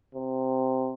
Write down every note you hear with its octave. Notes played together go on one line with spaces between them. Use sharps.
C3